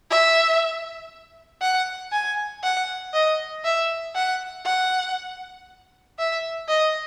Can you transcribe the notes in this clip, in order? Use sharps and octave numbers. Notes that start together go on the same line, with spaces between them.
E5
F#5
G#5
F#5
D#5
E5
F#5
F#5
E5
D#5